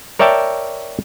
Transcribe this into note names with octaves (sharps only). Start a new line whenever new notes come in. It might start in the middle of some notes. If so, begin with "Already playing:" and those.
A#4 C#5 D5 E5 G5 A5